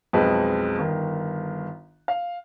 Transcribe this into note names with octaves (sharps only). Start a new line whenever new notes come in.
B1 F2 G#3 B4 D#5
G1 D#3
F5